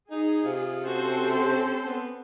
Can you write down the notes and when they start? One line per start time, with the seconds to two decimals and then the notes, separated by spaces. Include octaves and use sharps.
0.11 D#4 G#4
0.45 C3 F4
0.86 C4 C#4 F#4 A4 C5
1.84 B3